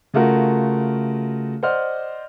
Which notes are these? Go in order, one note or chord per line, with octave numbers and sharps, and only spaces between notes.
C#3 A3 F4 F#4 A#4
C5 D5 D#5 F#5 F6